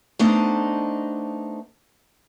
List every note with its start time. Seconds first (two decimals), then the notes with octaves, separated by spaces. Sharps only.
0.19 A3 B3 D4 D#4 C5 D#5